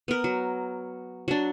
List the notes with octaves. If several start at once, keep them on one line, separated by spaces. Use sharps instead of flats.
B3 A#4
F#3
F#3 D4